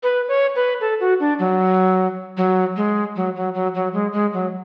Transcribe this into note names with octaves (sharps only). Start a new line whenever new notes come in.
B4
C#5
B4
A4
F#4
D4
F#3
F#3
G#3
F#3
F#3
F#3
F#3
G#3
G#3
F#3